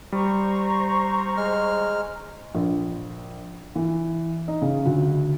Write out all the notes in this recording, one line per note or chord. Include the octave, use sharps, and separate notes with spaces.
G3 C5 A#5 C#6
G#3 F6
A#1
E3
D#4
C#3
D2